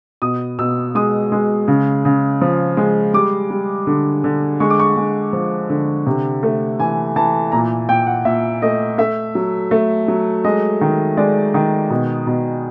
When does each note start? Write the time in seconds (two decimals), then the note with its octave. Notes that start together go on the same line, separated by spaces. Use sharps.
0.22 B2 D#6
0.59 B2 E6
0.95 G#3 D#6
1.32 G#3
1.68 C#3
2.05 C#3
2.42 F3
2.77 G#3
3.14 G3 D6
3.50 G3
3.87 D3
4.24 D3
4.60 G#3 C#6
4.70 D6
4.80 C#6
4.97 G#3
5.33 F3
5.70 D3
6.07 C3
6.43 A3
6.80 E3 G#5
7.16 E3 A5
7.52 A#2 A#5
7.89 A#2 G5
8.07 F#5
8.25 A#2 E5
8.62 A3 D#5
8.98 A3 E5
9.35 F#3
9.71 A3
10.08 F#3
10.45 G#3 D#5
10.81 D#3
11.17 G#3 D5
11.54 D#3
11.90 B2
12.27 B2